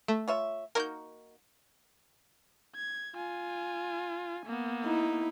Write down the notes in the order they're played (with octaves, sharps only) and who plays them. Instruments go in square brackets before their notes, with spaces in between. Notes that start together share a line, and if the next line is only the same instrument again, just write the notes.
[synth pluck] A3
[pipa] F4 C#5 E5
[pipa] A#3 D#4 F#4 [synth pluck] A#4 G6
[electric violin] G#6
F4 G#5
A#3 B3
[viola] D#4 E4